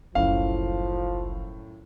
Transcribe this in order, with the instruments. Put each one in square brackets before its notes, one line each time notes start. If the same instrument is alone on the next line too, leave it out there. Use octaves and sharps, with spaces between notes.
[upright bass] F#1 C2 [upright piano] F#2 A2 [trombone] F3 [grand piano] F5